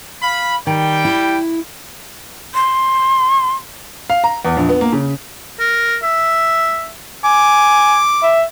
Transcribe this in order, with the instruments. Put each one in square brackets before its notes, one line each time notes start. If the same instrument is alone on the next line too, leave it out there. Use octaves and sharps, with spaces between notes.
[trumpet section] F5 B5
[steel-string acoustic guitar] D#3 [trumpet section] G3 G5
[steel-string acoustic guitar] E4
[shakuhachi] C6
[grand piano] F5
A#5
E2
A#1
B3
A#3
C#3
[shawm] A#4
E5
[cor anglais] G#5 [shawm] D6
[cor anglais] E5